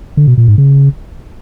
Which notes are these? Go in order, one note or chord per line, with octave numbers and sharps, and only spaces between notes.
D3
B2
A#2
G#2
C#3